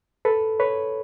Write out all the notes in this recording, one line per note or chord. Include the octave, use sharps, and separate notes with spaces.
A4 B4
B4 C#5